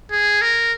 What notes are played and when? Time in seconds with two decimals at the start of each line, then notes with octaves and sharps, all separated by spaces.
0.11 G#4
0.42 A#4